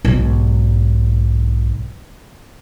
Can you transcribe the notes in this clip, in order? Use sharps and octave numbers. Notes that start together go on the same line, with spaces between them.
B1 G#2